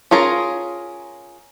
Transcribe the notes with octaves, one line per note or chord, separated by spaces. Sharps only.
C#4 F4 G#4 A#4 A#5